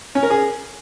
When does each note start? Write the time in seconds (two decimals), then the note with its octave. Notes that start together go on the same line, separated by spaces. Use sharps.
0.15 C#4
0.23 A#4
0.30 G#4